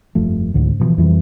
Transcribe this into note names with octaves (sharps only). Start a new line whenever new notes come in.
F1 G2 F3 A3
C#2 G#2 D3
B2 D3 E3 F3
F2 E3 G3